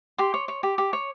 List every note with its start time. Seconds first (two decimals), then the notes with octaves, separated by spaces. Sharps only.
0.18 G4 C6
0.34 C#5
0.48 C#5
0.63 G4
0.78 G4
0.93 C#5